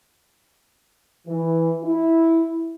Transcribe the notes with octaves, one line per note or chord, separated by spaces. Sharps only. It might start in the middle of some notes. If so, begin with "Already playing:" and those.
E3
E4